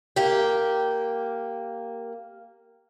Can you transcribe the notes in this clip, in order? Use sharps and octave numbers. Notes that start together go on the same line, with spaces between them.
A#3 G4